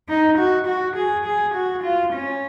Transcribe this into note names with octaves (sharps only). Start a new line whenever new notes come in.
D#4
F#4
F#4
G#4
G#4
F#4
F4
C#4